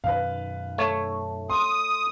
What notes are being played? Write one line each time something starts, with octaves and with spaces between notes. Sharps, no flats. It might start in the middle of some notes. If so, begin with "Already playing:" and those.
F#2 B2 D#3 B4 F5
A3 C#5
C6 D#6